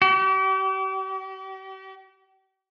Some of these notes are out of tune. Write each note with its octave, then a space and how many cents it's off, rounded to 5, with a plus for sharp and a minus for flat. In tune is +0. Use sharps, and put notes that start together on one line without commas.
G4 -40